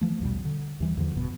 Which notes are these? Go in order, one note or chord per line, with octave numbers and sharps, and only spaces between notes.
E3 F3 A3
A#1 D#2 B2 G3
D3
D#2 E3 G3
E2 D3 F3
G1 B2